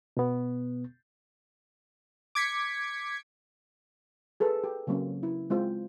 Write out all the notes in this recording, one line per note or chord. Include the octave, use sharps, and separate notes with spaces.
B2 B3
D6 G#6 B6 C#7
G#4 A4 B4
G4
C#3 F#3 A#3 C4 C#4
E4
G#3 C4 F4 C5